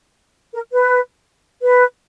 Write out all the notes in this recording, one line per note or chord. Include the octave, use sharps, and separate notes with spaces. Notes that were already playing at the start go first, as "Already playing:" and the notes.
A#4
B4
B4